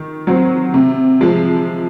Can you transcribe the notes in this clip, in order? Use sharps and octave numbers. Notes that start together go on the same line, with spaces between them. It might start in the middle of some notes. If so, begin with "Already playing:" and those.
Already playing: D#3
F#3 C4
C3
F3 G#3